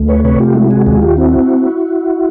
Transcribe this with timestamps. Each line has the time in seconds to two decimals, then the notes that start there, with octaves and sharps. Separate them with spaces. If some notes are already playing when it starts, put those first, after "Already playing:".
Already playing: D2 A3
0.08 B4 C#5
0.24 C3 B4 C#5
0.40 F4 G4
0.55 G#3 E4 F#4
0.70 F#4 G#4
0.86 D#2 F#4 G#4
0.97 F#4
1.02 F4 G4
1.17 C4 E4 F#4